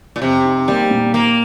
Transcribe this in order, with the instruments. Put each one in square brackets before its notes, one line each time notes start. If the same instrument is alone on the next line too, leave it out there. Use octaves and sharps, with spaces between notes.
[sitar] A#2
[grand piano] F2 [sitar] C3
[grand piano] D#4
[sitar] G3 [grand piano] A#3
[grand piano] A#2
[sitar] A#3 [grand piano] A#4